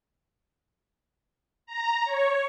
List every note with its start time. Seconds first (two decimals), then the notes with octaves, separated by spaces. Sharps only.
1.66 A#5
2.04 C#5